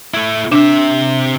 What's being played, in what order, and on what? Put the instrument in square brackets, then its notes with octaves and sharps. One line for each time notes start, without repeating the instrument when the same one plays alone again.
[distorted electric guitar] A3 E4
[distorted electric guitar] C3 E5 [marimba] D4